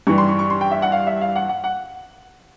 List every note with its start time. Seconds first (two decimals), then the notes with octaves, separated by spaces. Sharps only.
0.07 G2 E3 G3 C#6
0.18 C6
0.29 C#6
0.39 C#6
0.50 C6
0.61 G5
0.71 E5
0.82 F#5
0.92 F5
1.07 E5
1.21 F5
1.36 F#5
1.49 F#5
1.64 F#5